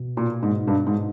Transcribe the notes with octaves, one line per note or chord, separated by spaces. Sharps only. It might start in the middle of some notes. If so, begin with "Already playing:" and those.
Already playing: B2
A#2
G#2
G2
G#2